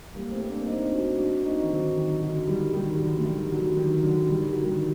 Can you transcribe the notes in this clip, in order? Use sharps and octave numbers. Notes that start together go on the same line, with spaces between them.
G3 A#3
A3 C4
C4
A#3 D4
C4 D#4
D4 F#4
D4 F#4
C4 D#4
D#3
D3 F#3
D#3
D3 F#3
D#3 G3
D#3 G3
D3 F#3
A3
D#3 G3
D3 F#3
D#3
D3 F#3
D#3 G3
D3 F#3
D#3 G3